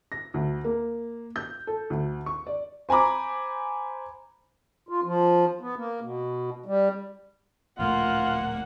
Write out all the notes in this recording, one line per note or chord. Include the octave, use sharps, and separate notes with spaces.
A#6
D2
A#3
G6
A4
D2
C#6
D5
C5 G#5 A#5 B5 D6
F4
F3
B3
A#3
B2
G3
D1 A#1 A3 A#3 F4 F#5